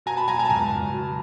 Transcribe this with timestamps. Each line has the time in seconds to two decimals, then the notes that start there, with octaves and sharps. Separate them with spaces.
0.06 B2 G#5 A#5
0.17 A5 B5
0.28 F#3 G#5 A#5
0.39 G#5 A#5
0.45 A5
0.49 C#2 G#5 A#5
0.71 C#2
0.94 F#3